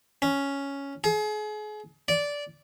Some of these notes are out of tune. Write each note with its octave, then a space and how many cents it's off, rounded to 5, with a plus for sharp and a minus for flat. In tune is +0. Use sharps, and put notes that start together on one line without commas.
C#4 +5
G#4 +35
D5 -15